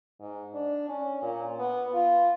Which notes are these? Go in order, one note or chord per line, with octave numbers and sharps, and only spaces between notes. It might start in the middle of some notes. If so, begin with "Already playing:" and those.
G#2
D4
C#4
A#2
B3
F4